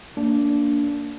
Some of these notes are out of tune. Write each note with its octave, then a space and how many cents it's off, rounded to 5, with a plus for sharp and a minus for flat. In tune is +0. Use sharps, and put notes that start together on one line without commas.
A#3 -15 D4 -20